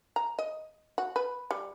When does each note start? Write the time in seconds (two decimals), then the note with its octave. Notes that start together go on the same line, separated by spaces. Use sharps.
0.16 A#5
0.39 D#5
0.98 F#4
1.16 B4
1.51 G3